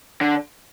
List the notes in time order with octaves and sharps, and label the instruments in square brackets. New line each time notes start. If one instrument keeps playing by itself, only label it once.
[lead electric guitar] D3